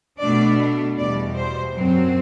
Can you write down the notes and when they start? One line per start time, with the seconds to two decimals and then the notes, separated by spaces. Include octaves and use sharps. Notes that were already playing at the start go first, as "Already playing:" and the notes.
0.21 B2 A3 D4 D5
0.98 E2 B2 G3 D5
1.37 C5
1.76 F#2 F#3 C4